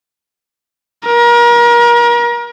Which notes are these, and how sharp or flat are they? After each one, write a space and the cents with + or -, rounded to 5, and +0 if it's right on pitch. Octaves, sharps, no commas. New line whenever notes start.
A#4 +35